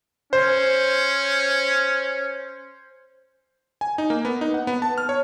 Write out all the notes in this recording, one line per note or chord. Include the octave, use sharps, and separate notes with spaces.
C#4 C5
G#5
D#4
A#3
B3
D#4
F#5
B3
A5
F6
C#5